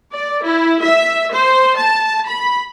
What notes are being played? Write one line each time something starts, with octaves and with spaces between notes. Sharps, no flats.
D5
E4
E5
C5
A5
B5